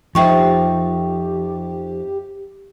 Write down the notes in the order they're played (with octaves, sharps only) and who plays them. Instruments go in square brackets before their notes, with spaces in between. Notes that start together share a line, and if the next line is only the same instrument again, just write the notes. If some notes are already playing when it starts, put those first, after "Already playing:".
[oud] F2 D#4 C5 [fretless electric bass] F3 [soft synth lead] G4 [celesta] E5 G5 C#6